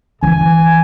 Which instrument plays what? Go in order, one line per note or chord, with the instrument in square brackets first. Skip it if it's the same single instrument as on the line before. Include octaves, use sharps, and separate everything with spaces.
[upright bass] E3 [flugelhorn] G#5